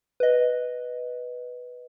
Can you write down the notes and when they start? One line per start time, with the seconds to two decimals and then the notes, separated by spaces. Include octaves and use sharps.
0.20 B4 D#5